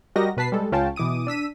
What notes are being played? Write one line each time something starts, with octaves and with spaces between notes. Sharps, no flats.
G3 F#4 G4 A#4 D#5 A#6
B2 B4 A5 B6 C7
G3 G#3 A4
C#2 C#4 F4 F5 G5 A5
B2 E3 D6 D#6 D#7
D4 E6 B6 D#7